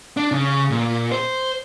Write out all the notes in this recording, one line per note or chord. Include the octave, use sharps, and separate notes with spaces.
D4
C#3
A#2
C5